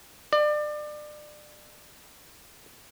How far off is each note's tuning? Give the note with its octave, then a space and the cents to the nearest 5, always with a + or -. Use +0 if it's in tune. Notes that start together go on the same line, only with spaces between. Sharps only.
D5 +30